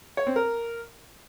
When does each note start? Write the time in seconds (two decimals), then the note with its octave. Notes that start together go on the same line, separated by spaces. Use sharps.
0.17 C#5
0.27 C4
0.36 A#4